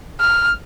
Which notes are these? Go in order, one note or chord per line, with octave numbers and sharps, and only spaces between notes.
F6